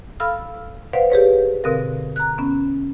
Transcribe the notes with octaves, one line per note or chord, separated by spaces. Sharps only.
A4 F5 B5 E6 F6
B4 C5 D5 F5 F#5
G4 G#4 B4 C#5
B2 D3 C4 A4 A#4 F5
A#5 F#6
B3 C#4